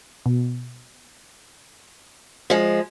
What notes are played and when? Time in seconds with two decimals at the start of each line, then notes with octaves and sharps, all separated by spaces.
0.26 B2
2.50 F3 G#3